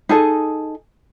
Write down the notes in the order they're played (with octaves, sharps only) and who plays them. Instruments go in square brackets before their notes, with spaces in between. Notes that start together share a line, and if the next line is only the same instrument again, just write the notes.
[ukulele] D#4 G#4 A4 D#5